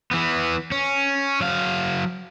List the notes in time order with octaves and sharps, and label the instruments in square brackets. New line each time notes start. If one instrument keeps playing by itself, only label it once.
[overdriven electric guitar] E3 B3
C#4
F#3 F5